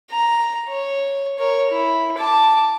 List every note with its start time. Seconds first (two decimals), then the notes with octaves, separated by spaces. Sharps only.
0.10 A#5
0.69 C#5
1.39 A#4 C#5
1.70 E4
2.18 A5 D6